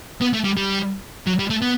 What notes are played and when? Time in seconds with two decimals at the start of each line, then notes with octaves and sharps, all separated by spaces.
0.22 B3
0.34 A3
0.45 G3
0.57 G3
1.27 F#3
1.39 G3
1.50 A3
1.62 B3